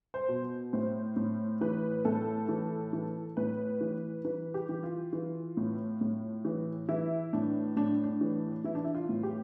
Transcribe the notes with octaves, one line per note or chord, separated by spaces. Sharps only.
C5
B2
A2 C5
A2
E3 B4
A2 A4
E3
E3
A2 B4
E3
E3 B4
G4
E3
F4
E3
A2
A2
E3
E3 E4
A2 D4
A2 D4
D4
E3
E3 E4
D4
E4
F4
A2
G4